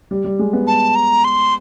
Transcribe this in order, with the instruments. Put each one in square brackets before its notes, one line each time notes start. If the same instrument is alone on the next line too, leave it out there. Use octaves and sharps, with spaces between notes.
[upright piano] G3
G3
G#3
B3
[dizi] A5
A#5
C6